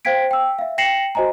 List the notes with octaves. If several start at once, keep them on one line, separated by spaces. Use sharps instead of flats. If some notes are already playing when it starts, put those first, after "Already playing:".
C5 F5 G5 G#6 B6 D7
G5 E6
E5 F5
G5 A#6 C7 C#7 E7 F#7
F#4 C5 D#5 G#5 A#5